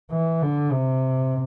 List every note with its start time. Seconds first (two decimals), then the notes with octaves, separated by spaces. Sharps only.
0.12 E3
0.42 D3
0.73 C3